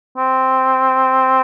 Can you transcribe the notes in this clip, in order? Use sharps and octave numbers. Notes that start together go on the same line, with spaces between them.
C4